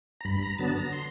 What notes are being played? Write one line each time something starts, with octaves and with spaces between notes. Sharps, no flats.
A#5
G2 B5
A#5
D3 F#3 B3 A5
A#5
C6